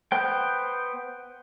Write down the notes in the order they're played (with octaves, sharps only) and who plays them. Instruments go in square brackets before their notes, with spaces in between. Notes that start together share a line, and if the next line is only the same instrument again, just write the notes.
[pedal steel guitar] B3 C5 G5